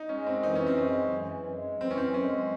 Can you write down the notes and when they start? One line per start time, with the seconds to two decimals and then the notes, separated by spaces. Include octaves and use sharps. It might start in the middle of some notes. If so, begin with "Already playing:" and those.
Already playing: D#4
0.09 G#3 C#4
0.26 F#2 C4
0.43 E3 D#4
0.55 C#4
0.60 F#2
0.67 C4
0.78 G#3 C#4
0.95 F#2
1.12 E3
1.29 F#2
1.46 G#3
1.64 F#2
1.80 E3 C4
1.91 C#4
1.97 F#2 C4
2.14 G#3 C#4
2.31 F#2